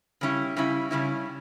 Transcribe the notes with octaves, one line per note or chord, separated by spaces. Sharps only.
C#3 G3 C#4 E4
C#3 G3 C#4 E4
C#3 G3 C#4 E4